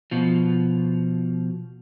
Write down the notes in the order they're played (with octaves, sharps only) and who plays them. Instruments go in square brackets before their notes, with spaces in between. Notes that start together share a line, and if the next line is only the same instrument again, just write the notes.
[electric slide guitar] B2 F3